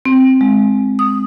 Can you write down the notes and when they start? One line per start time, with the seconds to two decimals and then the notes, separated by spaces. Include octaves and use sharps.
0.05 C4
0.41 G#3
0.99 D#6